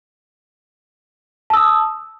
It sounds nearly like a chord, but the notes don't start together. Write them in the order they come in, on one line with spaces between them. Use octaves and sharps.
A5 E6 D#6